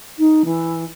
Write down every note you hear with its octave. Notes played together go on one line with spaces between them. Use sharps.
D#4
E3